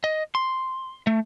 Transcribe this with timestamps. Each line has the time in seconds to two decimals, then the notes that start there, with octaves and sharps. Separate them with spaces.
0.04 D#5
0.35 C6
1.07 A3